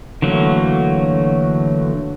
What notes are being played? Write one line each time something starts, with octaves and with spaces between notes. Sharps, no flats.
D3 E3 F#3 A3 A#3